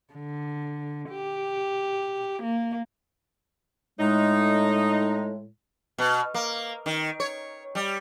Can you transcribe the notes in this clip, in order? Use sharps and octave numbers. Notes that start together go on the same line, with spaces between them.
D3
G4
A#3
A2 G#3 D#4
B2
A#3
D#3
C#5
G3